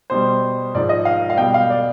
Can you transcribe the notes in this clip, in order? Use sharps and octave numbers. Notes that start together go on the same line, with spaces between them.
B2 G3 C5
G#2 F3 G#3 D5
D#5
F5
F5
B2 G3 G5
F5
D5